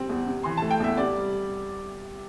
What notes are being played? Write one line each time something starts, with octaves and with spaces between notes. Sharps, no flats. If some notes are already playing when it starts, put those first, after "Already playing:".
Already playing: C3 G3 C4
E2
C3
E3 C6
A3 A5
G5
E2 E5
C3 D5
G3